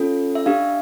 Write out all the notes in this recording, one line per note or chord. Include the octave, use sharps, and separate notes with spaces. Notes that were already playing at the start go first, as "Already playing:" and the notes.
Already playing: C#4 F4 A4
E5
D4 G4 F5